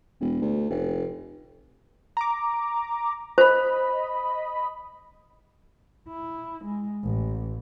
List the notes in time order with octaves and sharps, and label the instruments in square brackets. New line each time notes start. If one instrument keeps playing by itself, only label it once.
[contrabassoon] E1
D2
F1
[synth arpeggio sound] A#5 D6
[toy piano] C5 [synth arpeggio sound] D#5 B5
[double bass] E4
G#3
A1